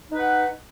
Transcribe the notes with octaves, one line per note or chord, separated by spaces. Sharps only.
D#4 B4 F#5